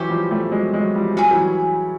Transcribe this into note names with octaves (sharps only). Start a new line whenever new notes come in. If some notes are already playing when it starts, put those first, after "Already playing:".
Already playing: E3 F#3 C#4 G4 C5
F3 G3
G3 A3
F#3 G#3
F#3 G#3
F3 G3
F#3 C#4 E4 G#4
G3
E3 F#3